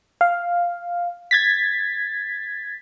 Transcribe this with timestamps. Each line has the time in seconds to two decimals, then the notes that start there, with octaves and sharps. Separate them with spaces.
0.21 F5
1.31 G#6 A6 B6